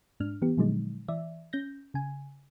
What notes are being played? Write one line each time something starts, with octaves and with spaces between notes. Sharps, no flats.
G#2 D4 F6
E3 B3 G4
A#2 D3 F3 F#3 G#3 D#4
E3 D5 E5
C#4 G6 A#6
C#3 G#5